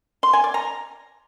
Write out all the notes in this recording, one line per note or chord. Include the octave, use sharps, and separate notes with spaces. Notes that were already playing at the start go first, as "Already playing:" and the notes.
C6
G#5
D5
A#5